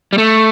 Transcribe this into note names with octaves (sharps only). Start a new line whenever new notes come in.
G3
A3